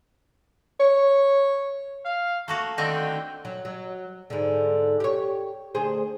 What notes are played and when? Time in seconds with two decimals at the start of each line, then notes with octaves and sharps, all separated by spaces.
0.80 C#5
2.05 F5
2.48 A3 A#3 F#4 A#5
2.78 D3 D#3 C4 D#4 G5
3.45 F#3
3.65 F#3
4.30 G#2 D3
5.00 G4 C#5
5.75 D2 G#4 C5